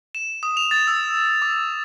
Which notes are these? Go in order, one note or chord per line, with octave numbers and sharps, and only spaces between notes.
E7
D#6
F7
A6
E6
D6